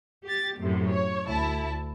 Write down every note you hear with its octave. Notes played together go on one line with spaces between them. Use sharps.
G4 A6
F#2 A2 C3
C#5
D2 E4 A5